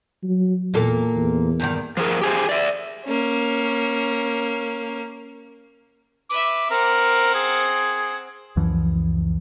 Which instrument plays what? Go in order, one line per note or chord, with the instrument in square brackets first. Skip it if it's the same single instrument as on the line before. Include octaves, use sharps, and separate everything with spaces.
[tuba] F#3
[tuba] E2 [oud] A#2 A#3 A4
[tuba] E2
[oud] E2 G2 D#3
[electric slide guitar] F3 F#3 G#4 A#4
G4 G#4 C5
D5 E5
[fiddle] A#3 C#4
[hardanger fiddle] B4 E5 [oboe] D6
[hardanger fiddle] C4 F#5 [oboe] A#4
[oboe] G#4
[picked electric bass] C#2 F#2 E3 F3